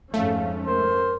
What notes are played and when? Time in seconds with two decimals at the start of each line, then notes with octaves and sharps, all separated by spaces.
0.14 F2 G#2 A3 C#4 F5
0.66 A#4 C5